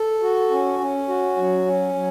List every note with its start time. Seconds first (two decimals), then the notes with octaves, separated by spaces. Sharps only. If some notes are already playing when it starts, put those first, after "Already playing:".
Already playing: A4
0.22 F#4
0.51 C#4
0.79 C#4
1.08 F#4
1.37 F#3
1.66 C#4
1.94 F#3